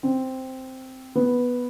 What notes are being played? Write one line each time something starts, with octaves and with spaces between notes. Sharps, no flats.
C4
B3